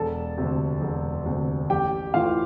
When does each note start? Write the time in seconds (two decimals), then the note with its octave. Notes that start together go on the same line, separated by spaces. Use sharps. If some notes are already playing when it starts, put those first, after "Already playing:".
Already playing: E1 A4 A5
0.38 D2 C3
0.81 E1
1.26 D2 C3
1.70 A1 G4 G5
2.14 A2 E3 A3 F4 F5